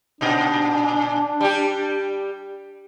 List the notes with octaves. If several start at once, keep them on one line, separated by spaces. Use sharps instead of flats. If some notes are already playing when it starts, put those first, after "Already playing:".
A#2 D4 D#4
G3 G4